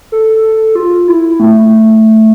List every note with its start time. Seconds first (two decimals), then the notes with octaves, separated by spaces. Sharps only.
0.12 A4
0.75 F4
1.08 E4
1.40 A3